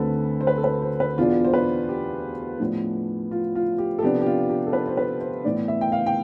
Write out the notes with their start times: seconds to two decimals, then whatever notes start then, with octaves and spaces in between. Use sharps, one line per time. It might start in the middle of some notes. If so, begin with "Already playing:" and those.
Already playing: D2 D3 A3 C4 A4 B4
0.41 C5
0.47 B4
0.58 A4
0.64 B4
0.82 C5
1.00 B4
1.18 E2 B2 B3 D4 F4
1.44 C5
1.54 B4
1.89 G4
2.60 A2 F3 B3 D4
3.31 F4
3.55 F4
3.78 G4
3.99 A4
4.02 C3 F3 B3 D4 G4
4.22 G4
4.26 F4
4.50 G4
4.67 A4
4.73 B4
4.87 C5
4.97 B4
5.21 C5
5.45 A2 E3 B3 D5
5.68 E5
5.81 G5
5.92 F5
6.06 G5